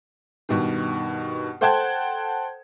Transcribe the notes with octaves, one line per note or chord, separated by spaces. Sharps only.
G2 B2 D#3
A4 C5 F#5 G5 A5 G#6